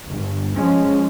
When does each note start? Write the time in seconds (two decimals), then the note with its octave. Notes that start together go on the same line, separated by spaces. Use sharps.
0.11 G1
0.58 F3 G#3 C#4